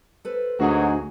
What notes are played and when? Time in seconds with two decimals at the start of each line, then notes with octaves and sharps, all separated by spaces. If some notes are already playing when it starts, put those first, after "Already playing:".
0.25 A4 B4 C5
0.60 D2 G#2 F#3 G#3 F#4 G#4